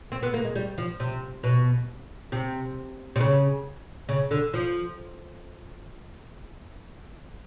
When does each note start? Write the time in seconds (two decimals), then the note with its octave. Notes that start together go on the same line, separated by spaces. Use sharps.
0.12 C4
0.23 B3
0.34 A#3
0.45 G#3
0.56 G3
0.78 F3
1.00 C3
1.43 B2
2.32 C3
3.16 C3
3.20 C#3
4.09 C#3
4.31 D3
4.54 F3